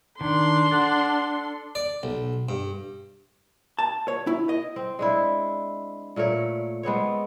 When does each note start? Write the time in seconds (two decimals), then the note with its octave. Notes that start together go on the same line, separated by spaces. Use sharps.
0.21 D#3 D4 C6
0.71 A4 F#5
1.75 D5
2.03 B1
2.49 G2
3.79 A5
4.08 C#5
4.27 E4
4.49 D#5
4.76 C4
4.99 G#3 D4 E4
6.16 A#2 A3 A#4 C#5
6.83 G#3 B3 C4 C#5